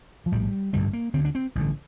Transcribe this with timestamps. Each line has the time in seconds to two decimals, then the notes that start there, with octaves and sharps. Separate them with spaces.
0.26 F3
0.32 A#1 A2 G3
0.73 A1 G2 D3 G3
0.93 A#3
1.14 D2 D3 C4
1.25 D4
1.35 C4
1.55 A1 G2 D3